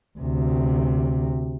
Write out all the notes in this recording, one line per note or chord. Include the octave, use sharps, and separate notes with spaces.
D2 C3